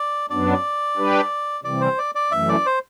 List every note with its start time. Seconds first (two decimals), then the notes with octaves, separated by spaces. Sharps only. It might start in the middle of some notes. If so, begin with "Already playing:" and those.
Already playing: D5
0.30 F#2 F#3 B3 D4 D5
0.97 G3 D4 G4 B4
1.64 C3 E3 G3 C4 D5
1.81 C5
1.98 D5
2.15 D5
2.32 F#2 E3 A3 E5
2.49 D5
2.66 C5